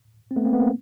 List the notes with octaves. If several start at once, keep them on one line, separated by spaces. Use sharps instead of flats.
C4
A3 B3
A#3 C4
A3 B3
A#3 C4